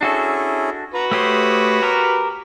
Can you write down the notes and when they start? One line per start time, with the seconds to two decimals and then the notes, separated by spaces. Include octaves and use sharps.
0.01 C#4 D4 E4 F#4 G#4 A4
0.94 F#4 B4 A#5
1.11 A3 G4 C5 C#5 D#6
1.82 G4 A#4